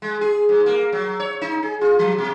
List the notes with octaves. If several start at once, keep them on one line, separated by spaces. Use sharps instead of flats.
G#3
G#4
G#2
A#3
F#3
C#5
D#4
G#4
F4
F3
B2